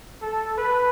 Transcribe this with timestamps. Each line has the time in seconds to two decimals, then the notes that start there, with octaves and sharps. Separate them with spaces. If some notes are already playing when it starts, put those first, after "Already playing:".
0.22 A4
0.58 B4